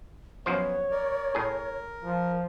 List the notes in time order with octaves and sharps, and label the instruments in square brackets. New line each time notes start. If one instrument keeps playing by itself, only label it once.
[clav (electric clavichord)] F#2 F3 C5 [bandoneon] B3 [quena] C#5
[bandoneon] A#4 D5
[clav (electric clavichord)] A2 G#4 [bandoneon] A#4
[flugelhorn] F3